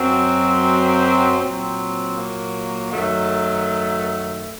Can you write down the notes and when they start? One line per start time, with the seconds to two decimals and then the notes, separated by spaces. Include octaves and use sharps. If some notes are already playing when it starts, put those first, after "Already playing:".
Already playing: F#2 F#3 C4
1.39 A#2 F#3 C4
2.16 A#3
2.92 F#2 D#3 F#3 A3